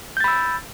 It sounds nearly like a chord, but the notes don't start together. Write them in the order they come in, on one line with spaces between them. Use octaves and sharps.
G6 A6 B5 E6